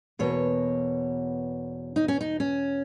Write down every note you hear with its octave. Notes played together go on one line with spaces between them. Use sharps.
E2 B2 A#3 C#5
D#4
C#4
D#4
C#4